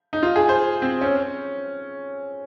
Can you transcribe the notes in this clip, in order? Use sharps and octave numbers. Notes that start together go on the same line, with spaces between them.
D#4
F4
G#4
C5
C4
C#4